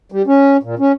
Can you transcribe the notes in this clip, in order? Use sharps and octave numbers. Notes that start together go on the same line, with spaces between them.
G3
C#4
A#2
C#4